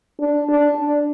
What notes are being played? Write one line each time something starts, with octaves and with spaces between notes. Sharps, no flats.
D4
D4
D4